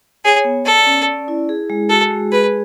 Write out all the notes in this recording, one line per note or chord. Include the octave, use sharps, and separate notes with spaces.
G#4 C#5
B3
A4 D5
C#4
D5
E4
G#4
G#3
F#4 A4
G#3
G#4 B4